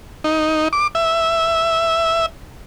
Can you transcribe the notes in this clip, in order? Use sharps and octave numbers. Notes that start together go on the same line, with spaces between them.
D#4
D6
E5